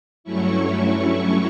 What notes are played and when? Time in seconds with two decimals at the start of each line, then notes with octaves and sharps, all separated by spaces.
0.24 G2 F#3 A3 C#4 E4 C#6